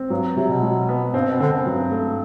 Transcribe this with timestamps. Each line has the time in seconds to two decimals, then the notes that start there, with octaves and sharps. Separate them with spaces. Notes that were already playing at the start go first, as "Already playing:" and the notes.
Already playing: C4
0.10 G2 F#3
0.37 C3 F#3
0.49 B2
0.63 F#3
0.89 B3
1.14 G2 C4
1.27 B2
1.40 D3 C4
1.53 F#2
1.66 G2 F#3
1.91 A3